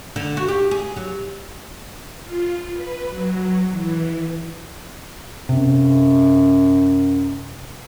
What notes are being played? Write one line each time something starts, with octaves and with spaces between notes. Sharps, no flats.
D3
F#4
G4
G#4
F#3
F4
B4
F#3
E3
F#2 C3